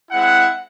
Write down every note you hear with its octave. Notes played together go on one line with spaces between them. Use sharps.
G#3 C4 E4 F#5